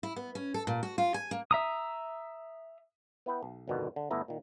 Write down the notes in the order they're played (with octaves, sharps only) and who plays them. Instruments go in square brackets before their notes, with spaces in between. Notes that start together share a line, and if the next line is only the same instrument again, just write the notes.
[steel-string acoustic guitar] E4
B3
C#4
A4
A#2
F#4
F4
G#5
A#3
[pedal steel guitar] E5 A#5 D#6
[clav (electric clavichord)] B3 E4 B4 G5
B1
G1 F2 B2 D3 D#3
D3
G1 A3 B3 E4 E5 A#5
A#2 D#3